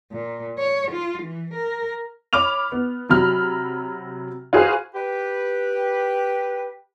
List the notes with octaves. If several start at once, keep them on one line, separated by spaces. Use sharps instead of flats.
A#2
C#5
F4
E3
A#4
C#5 B5 D6 F6 F7
B3
C3 F#3 B5 F6
F4 F#4 G#4 B4 C5 F5
G4 B4